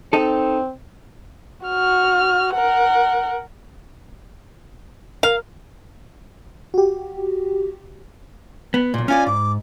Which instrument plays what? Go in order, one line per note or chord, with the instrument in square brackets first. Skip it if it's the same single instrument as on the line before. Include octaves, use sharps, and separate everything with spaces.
[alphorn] C4 [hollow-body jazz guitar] D#4 A4
[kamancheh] F#4 F6
A#4 F#5
[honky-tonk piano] A#4 [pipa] F5
[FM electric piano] F#4 G4
[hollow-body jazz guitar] B3
B1 A#2
[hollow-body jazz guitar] C#4 F4 D5 [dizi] G#5
[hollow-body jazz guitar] G#2 [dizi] D6